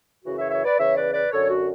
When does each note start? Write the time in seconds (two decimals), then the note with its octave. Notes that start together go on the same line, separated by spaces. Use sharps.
0.25 F#2 C#3 E3 F#4
0.38 C#5 E5
0.51 C#5 E5
0.65 B4 D5
0.78 E2 C#3 E3 C#5 E5
0.96 B4 D5
1.14 B4 D5
1.32 F#2 D3 A4 C#5
1.50 F#4